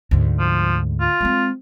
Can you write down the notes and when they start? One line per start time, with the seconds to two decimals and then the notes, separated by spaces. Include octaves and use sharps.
0.11 D2 G#2
0.39 F3
1.00 F4
1.21 G#3 C4